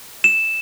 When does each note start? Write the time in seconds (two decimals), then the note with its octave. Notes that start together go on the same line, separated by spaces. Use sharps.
0.24 E7